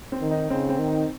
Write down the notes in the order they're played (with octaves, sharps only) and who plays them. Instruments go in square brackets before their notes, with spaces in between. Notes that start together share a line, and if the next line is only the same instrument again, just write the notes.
[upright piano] C4
[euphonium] D#3
[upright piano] D#4
[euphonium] C#3 [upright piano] C4
[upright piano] C4
[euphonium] D#3
[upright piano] D#4